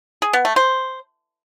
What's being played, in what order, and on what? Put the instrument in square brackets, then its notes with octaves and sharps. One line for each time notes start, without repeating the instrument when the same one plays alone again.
[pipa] G#4
B3
A3
C5